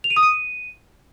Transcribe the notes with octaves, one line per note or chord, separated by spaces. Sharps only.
F7
D#7
D#6
D#7